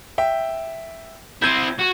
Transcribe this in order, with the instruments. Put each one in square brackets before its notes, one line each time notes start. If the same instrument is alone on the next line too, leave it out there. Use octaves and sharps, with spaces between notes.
[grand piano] E5 G5
[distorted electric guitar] C4 E4 [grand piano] G6 G#6 D#7
[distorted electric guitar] F#4